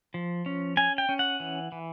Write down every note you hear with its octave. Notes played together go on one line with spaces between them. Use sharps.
F3
C#4
C#4 G#5
G5
C#4
F#5
E3
E3